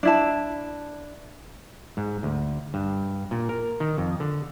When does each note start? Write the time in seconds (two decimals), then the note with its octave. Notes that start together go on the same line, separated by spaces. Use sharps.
0.03 D4 E4 A5
1.97 G#2
2.23 D2
2.74 G2
3.31 A#2
3.49 A#4
3.80 D#3
3.98 F2
4.20 D3